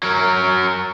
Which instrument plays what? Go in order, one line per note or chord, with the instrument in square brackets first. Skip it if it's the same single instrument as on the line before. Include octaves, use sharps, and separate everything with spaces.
[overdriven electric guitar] F#3 A#4